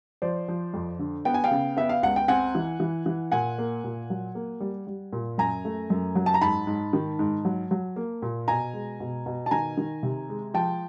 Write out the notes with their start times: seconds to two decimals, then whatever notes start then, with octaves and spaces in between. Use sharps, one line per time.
0.22 F3 C5 D5
0.48 F3
0.74 F2
0.99 D3
1.25 B3 G5
1.34 G#5
1.44 F5 G5
1.51 C#3
1.77 B3 E5
1.89 F5
2.02 C#2 F#5
2.16 G5
2.28 C4 F#5 G#5
2.55 E3
2.80 E3
3.06 E3
3.32 A#2 F#5 G#5
3.58 A#3
3.84 A#2
4.10 F#3
4.35 A#3
4.60 G3
4.87 G3
5.13 A#2
5.38 F#2 G#5 A#5
5.65 A3
5.90 F#2
6.15 F#3
6.26 A5
6.34 A#5
6.41 G#2 A5 B5
6.67 G#2
6.93 D#3
7.19 G#2
7.45 F#3
7.71 F#3
7.96 A#3
8.22 A#2
8.48 B2 G#5 A#5
8.73 G#3
9.00 B2
9.26 B2
9.46 A5
9.51 D#3 G#5 A#5
9.77 D#3
10.03 C3
10.29 G#3
10.54 F3 G5 A5